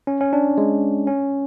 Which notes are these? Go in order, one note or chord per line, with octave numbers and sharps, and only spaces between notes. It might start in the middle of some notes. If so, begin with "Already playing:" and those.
C#4
C#4
D4
G#3
C#4